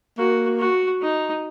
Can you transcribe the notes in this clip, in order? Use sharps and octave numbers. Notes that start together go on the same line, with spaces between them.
A#3 F#4
F#4
D#4